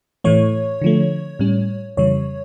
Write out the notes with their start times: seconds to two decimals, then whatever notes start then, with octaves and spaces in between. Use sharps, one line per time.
0.24 A2 E3 A3 C#5
0.82 D3 F3 A3
1.39 A2 G3 C#4
1.97 F2 C#3 E3 G3 C#5